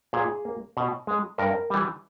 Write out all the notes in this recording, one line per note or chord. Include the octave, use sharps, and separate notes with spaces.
A#2 G#4
A#3
B2
G#3
G2 A#4
E3 G3